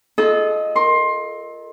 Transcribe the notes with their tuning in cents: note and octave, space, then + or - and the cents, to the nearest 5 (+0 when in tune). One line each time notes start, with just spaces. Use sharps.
F4 +0 A4 -30 D#5 +0
A#4 +0 C6 +20